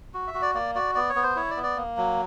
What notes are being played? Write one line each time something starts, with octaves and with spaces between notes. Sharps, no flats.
F#4
E5
F#4
D5
A#3 D5
F#4 D5
B3 D5
C#5
B3
C5
E4 C#5
D5
B3
D5
A#3
F#3